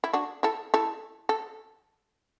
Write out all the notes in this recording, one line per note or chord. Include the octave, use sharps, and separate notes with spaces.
E4
D4 F#4
E4 A4
E4 A4
A4